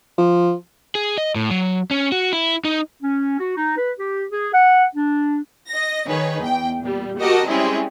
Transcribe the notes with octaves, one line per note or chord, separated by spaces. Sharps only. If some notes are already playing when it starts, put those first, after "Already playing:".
F3
G#4
D#5
A2
F#3
C#4
F#4
E4
D#4
C#4
F#4
D#4
B4
G4
G#4
F#5
D4
D#5 A#6
D#3 D#4 G#4 B4 C#5
E2 G5
A#2 G3
F#4 G4 A#4 D#5 A5 D6
G3 G#3 C4 C#4 E4 G#4